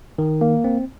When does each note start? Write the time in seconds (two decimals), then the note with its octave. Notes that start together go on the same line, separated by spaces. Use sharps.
0.18 D#3
0.41 A#3
0.64 C4